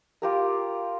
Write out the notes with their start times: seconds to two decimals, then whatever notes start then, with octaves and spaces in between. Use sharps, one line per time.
0.22 F4 G4 A#4